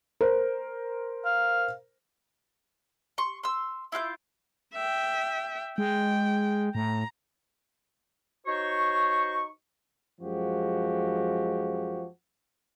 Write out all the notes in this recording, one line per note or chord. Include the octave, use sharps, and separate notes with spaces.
A#4 C5
F5
C6 C#6
C6 E6
E4 F4 F#6 G6
E5 G5
G#3 G5
A2 A#5
D#4 F#4 C5 C#5 C#6
F#2 F3 G#3 F#4 G4